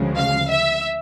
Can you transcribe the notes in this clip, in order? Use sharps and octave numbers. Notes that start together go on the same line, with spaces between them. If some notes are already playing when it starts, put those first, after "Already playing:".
Already playing: D2 C#3 F3 G#3
F5
E5